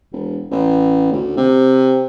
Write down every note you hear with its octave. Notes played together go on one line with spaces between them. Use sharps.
E1
A1
D2
C3